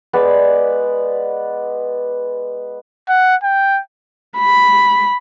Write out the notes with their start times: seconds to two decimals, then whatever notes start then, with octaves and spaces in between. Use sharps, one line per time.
0.13 G#3 B3 D5
3.09 F#5
3.43 G5
4.38 B5